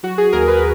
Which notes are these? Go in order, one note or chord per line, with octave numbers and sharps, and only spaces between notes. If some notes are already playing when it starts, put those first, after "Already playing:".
F#3 F#4
G#4
D#2 A#4
B4